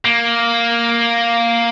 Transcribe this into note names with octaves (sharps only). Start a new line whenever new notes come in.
A#3